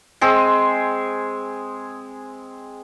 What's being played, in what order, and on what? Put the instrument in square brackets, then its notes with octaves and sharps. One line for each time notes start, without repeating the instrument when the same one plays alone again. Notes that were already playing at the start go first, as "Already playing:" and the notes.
[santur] G#3 C4 G#4